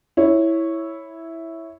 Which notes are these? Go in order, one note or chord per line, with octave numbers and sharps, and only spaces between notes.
E4 C#5